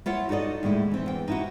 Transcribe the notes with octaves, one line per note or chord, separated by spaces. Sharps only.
E4 F4 C#5 F#5
D#4 F#4 A4 D5 D#5
D#2 A2 G#3 E4
E3 C4
E2 G5
D#4 E4 F#4